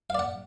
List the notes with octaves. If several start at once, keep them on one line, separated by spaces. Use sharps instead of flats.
D5 F5 F#5